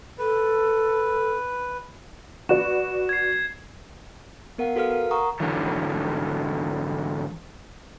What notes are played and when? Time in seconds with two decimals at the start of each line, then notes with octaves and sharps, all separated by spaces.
0.18 A4 B4
2.49 F#4 B4 D5 E7
3.09 G#6 C7
4.58 B3 A#4 F5 F#5
4.76 F#4 A4 B4 F5 F6
4.91 A#4
5.11 F#5 A#5 C#6 D#6
5.40 G#2 D3 E3 F#3